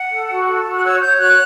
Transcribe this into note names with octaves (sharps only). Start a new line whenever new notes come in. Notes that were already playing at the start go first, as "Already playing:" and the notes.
Already playing: F#5
A4
F#4
A4
F#4
F#6
C#5 E6
C#5 G6
F#4 F#6